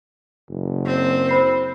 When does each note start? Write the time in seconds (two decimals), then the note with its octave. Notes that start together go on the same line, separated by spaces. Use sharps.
0.49 F#1
0.86 C4
1.29 C5 B5 C7